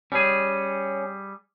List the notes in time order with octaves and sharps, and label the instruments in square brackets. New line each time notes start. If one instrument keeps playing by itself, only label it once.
[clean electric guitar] G3 G#4 [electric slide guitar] C#4